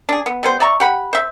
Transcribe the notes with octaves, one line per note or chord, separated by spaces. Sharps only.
D4 G#4
B3
G3 B3 C5
D5 E5 A#5 C#6
G4 F#5 B5
C5 E5